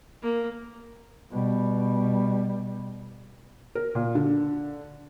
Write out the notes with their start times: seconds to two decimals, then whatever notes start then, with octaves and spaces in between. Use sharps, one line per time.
0.23 A#3
1.31 B2 G3
3.75 A#4
3.95 A#2
4.15 D3